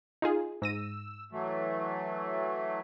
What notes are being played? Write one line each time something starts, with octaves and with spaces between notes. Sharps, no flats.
D#4 F4 G#4
G#2 E6 A#6 D#7
E3 F#3 A3